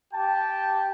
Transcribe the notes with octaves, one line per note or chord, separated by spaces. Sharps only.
G4 G5 A5